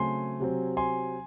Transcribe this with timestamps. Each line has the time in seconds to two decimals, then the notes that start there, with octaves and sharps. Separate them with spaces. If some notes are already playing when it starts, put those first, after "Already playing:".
Already playing: C#3 F#3 A3 C4 G#5 C6
0.40 C3 F#3 C4
0.77 G#5 C6